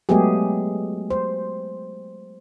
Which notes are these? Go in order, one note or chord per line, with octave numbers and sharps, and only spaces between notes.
F#3 G#3 A3 B3 G4 G#4
C5